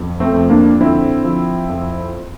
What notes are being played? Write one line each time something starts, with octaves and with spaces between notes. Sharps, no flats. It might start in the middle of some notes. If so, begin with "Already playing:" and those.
Already playing: F2
A3 C4
F2
A#3 D4
D3 C4 E4
F3
F2